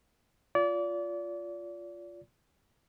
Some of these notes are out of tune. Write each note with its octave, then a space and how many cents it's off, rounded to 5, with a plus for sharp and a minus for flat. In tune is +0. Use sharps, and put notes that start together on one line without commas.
F4 +0 D5 -30